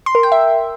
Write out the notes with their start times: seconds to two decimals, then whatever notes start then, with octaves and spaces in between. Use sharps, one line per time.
0.06 C6
0.15 A#4
0.23 G5
0.32 E5